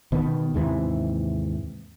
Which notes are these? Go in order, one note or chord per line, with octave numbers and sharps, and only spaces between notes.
B2 D#3 B3
D#2 G#2 C3 E3